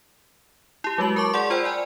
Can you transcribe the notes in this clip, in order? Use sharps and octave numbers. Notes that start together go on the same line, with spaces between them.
E4 G4
F#3 G#3 F#4 F#7
A#4 A5 C#6 D6
G#4 D5 F#5 C6
F4 C5 D5 G5 B5 E6
D5 G#5